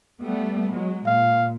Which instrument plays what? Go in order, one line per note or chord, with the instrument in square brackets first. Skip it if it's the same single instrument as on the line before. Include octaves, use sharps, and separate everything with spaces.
[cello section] G3 A3 B3
F#3 G#3
[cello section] A#2 [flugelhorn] F5